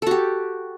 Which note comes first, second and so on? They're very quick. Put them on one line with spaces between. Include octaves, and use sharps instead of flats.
A4 F#4 G4